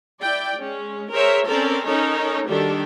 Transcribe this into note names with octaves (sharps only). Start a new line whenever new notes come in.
E4 D5 G5
G#3 C#4
G#4 A#4 C5 C#5 E5
C4 C#4 A4 A#4 D5
C#4 D#4 A4 A#4 C#5
D#3 G3 D4 F#4 G4 A4